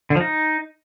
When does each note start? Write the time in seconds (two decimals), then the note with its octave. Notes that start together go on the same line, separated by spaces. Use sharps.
0.10 D3
0.15 F3
0.21 D#4